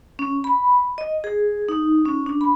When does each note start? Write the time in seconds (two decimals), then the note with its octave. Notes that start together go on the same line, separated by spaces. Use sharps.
0.19 C#4
0.44 B5
0.98 D#5
1.24 G#4
1.69 D#4
2.05 C#4
2.26 D4
2.41 B5